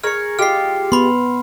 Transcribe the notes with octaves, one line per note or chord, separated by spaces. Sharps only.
G#4 A#4 C#5 F6 C#7
G#3 F4 G4 F6 C7
B3 B5 C6